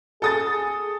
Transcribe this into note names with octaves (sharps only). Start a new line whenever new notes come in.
G#4 A4 D#6 A6